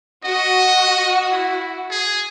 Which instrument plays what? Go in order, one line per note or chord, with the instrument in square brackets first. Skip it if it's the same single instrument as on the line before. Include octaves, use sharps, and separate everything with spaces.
[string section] F#4 [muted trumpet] D#5
[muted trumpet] E4
G#4